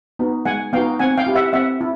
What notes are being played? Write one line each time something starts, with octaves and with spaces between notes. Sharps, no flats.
B3 D#4 F#4
G#3 F#5 G#5
B3 D#4 F#4 F5 G5
C4 F#5 G#5
F5 G5
E4 G4
E5 F#5
C4 E5 F#5
E4